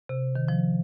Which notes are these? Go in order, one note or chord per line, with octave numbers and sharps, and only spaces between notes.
C3
D#3
F3